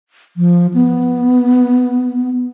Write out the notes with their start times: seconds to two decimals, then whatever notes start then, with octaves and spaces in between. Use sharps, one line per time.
0.37 F3
0.74 B3